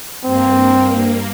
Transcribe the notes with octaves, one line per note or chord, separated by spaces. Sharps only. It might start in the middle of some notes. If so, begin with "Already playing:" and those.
G2 A#3 C4